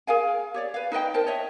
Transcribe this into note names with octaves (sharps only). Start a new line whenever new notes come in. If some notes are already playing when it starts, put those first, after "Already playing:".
G#4 A#4 F5 G#5
G4 C#5 D5
B4 F5
D#4 B4 D#5 G5
A#4 C5 A5
C#5 D#5 E5